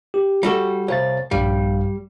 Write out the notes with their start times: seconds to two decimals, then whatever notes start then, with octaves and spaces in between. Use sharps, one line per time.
0.14 G4
0.43 G3 F#4 A4
0.88 C2 C#5 F5 A6
1.31 A#1 G2 G3 F5